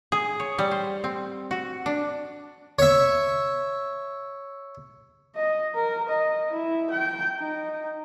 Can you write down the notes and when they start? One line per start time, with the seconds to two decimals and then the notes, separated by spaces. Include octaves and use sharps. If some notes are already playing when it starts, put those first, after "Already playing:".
0.12 G#4
0.40 C#5
0.58 G3
0.71 C5
1.04 C4
1.51 F#4
1.86 D4
2.79 C#5 E5
5.36 D#5
5.75 A#4
6.09 D#5
6.53 E4
6.90 G5
7.39 D#4